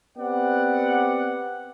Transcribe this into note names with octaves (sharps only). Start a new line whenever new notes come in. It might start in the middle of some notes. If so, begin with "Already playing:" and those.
B3 C4 G4 D5 F#5